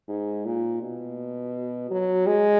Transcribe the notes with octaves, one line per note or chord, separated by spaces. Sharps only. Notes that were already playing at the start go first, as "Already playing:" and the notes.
G#2
A#2
B2
F#3
G#3